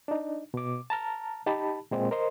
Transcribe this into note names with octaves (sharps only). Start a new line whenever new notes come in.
D4 D#4
B2 D6
A5 A#5 F6
D#4 G4 A5 B5
A#2 G#3 C4
A#4 C5 D#5 C6